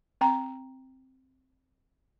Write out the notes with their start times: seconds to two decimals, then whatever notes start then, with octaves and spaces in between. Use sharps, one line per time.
0.21 C4 G5 A#5